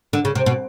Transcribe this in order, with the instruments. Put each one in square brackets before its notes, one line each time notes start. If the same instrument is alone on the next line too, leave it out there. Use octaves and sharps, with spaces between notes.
[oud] D3
C#3
C3
B2